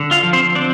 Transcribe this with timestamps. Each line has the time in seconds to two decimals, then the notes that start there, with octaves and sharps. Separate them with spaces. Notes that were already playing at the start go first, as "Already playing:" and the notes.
Already playing: D3
0.11 F4 F5
0.23 F3
0.33 C4 C5
0.55 C4 D4 D5